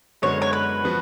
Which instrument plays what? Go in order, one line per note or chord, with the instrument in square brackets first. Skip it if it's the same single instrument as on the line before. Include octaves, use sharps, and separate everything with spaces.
[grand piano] F#2 D3 G#3 B3 F#4 [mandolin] C#5
[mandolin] C#5
B4
[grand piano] F3 B3 F#4